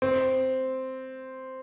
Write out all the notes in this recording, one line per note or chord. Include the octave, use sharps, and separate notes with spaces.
C4